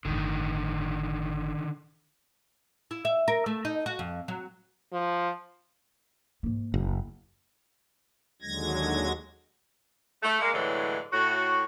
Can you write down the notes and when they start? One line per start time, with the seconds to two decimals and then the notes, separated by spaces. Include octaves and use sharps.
0.05 G1 A2 D3 D#3
2.91 E4
3.05 E5
3.28 A#4
3.46 A3
3.65 D#4
3.86 F#4
3.99 F2
4.28 F#3
4.93 F3
6.43 G#2 A#3
6.74 F#1
6.87 D#2 E4
8.42 D#2 D3 F#3 G#3 G#6 A#6
10.23 A3
10.40 G#3 A#3
10.53 A2 D3 E3 F#3 G#3
11.12 A2 F#4